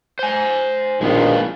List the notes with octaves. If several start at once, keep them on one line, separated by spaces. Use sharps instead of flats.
C5 G#5
A#1 B2 D#3 G#3 B3 F4